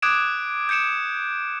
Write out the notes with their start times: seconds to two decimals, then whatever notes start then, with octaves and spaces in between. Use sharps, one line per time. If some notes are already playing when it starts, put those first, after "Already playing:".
0.02 D6 D#6 F#6 G#6 D7 E7
0.69 G6 G#6 C#7 D7 E7